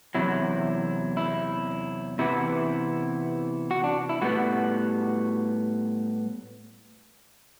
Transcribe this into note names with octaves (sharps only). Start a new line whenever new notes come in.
E2 C3 F#3 E4
E4
C3 E3 B3 E4
F#4
D4
E4
A2 G3 B3 F#4